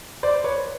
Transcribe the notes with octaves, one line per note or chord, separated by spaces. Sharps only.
C5 D5
B4 C#5